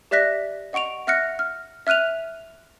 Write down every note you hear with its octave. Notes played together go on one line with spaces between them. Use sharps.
G4 D5 E5 F#6 A#6 B6
D#5 F#5 C#6 D7 F7
E5 F#5 F6 F#6 A#6 C#7
F6
E5 F6 F#6 D#7 F7